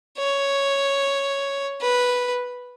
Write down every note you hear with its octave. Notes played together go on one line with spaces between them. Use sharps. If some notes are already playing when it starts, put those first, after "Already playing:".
C#5
B4